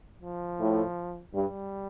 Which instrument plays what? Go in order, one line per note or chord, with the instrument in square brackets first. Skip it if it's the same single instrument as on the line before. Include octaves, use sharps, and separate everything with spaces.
[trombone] F3
[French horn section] A2
[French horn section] G2 [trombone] G3